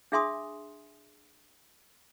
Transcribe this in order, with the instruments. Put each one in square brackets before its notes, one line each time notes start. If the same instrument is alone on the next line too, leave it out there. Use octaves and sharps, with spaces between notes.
[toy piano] D4 G#4 E5 G#5 C6 D#6